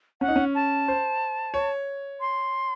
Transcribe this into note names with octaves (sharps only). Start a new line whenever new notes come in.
C#4 F#5
D#4
C#4
A5
C5
C#5
C6